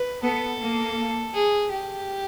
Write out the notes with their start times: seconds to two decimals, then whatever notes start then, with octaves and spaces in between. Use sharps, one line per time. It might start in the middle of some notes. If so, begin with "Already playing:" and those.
Already playing: B4
0.23 B3 A4
0.60 A#3
1.34 G#4
1.72 G4